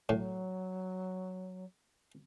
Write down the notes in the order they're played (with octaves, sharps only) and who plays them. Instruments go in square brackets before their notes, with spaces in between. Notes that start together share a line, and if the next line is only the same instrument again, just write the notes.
[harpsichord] A2 [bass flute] F#3